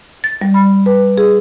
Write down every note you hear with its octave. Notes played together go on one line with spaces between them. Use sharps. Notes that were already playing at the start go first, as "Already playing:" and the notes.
A6
G3
B5
B4
G#4